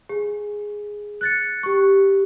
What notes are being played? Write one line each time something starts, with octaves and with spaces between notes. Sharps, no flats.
G#4
F#6 A6 C#7
G4 C#6